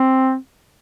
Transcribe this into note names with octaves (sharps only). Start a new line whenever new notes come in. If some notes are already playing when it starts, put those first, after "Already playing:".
Already playing: C4